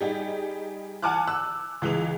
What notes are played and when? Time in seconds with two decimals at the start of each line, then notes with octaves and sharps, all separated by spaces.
0.01 G3 D#4 G4 G#4
1.02 F#5 G#5 A5 D6 F6 F#6
1.27 E6 F#6
1.82 C#2 E3 G#3 F7